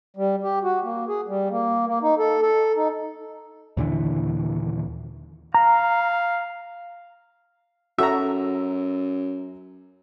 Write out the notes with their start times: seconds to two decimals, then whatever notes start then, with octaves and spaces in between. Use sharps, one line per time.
0.17 G3
0.43 G4
0.63 F#4
0.84 A#3
1.08 G#4
1.28 G3
1.50 A#3
1.87 A#3
2.02 D#4
2.18 A4
2.42 A4
2.76 D#4
3.77 D#2 A#2 D3 E3
5.54 F5 A#5
7.99 F#2 F#4 A4 E5 A#5